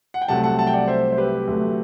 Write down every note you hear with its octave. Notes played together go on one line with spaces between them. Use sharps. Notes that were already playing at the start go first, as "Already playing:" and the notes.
F#5
G5
C2 C3 F#3 A3 F#5 A5
F#5 A5
F#5 A5
G5
D5 F#5
C5 E5
C5
G4 B4
D2 C3 F#3 A3